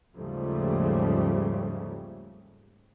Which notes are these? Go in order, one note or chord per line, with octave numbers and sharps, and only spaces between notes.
D#2 G#2 C#3 F3 G3 A3